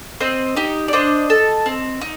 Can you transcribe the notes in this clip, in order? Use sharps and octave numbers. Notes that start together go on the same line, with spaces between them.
C4 C5 D#5
D#4 G4
D5
D4 C5 D#5
A4
C4
D#4